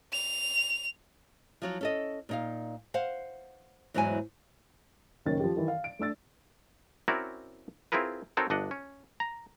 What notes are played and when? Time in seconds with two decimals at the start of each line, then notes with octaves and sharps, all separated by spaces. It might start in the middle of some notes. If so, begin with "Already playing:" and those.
0.12 F7
1.62 F3 F#3 F4
1.81 C#4 A4 D#5
2.29 A#2 D#4 F5
2.94 C5 F5 F#5
3.94 E2 G#2 F#3 E4 C5 G#5
5.26 F#1 A#2 D#3 C#4 C#5 A6
5.40 F3 G4
5.56 D#3 E3
5.68 F5
5.84 D7
5.99 A3 D4 E6 A6
7.08 C4 C#4 E4 F#4 A#4 D5
7.92 C4 E4 F4 G#4 A#4 B4
8.37 C4 D#4 F#4 A4 A#4 C#5
8.50 G1 D4 D#5 F#5
8.71 C#4
9.20 A#5